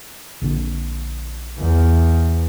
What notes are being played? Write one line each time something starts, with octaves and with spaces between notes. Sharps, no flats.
A#1 D3
E2